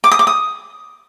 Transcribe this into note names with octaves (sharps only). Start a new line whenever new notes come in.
D6
D#6
D6
D#6